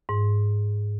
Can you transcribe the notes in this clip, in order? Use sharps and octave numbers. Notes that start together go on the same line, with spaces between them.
G#2